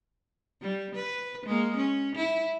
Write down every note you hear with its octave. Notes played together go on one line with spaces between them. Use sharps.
G3
B4
G#3 A#3
C#4
E4